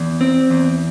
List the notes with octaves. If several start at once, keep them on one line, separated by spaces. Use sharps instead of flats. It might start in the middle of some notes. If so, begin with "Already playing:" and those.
Already playing: E2
C4
E2